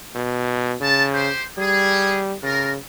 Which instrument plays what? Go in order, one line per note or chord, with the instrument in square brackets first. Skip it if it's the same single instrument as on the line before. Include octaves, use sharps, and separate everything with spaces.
[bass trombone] B2
[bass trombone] C#3 [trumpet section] A5
[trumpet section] G4 C5
[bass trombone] G3 [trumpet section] G#4
[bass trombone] C#3 [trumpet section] F4 A#4